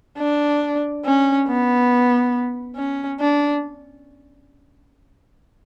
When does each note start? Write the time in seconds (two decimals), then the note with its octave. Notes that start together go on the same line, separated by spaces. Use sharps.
0.18 D4
1.05 C#4
1.48 B3
2.77 C#4
3.20 D4